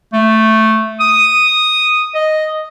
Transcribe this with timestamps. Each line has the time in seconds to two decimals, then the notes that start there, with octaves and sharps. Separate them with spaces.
0.13 A3
1.00 D#6
2.15 D#5